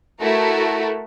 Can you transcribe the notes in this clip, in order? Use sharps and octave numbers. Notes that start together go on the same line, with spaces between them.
A3 E4 F#4 A4 A#4